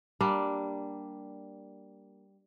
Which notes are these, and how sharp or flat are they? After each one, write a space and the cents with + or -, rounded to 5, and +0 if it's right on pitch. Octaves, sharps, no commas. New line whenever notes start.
G3 -5 A#3 +0 D4 +0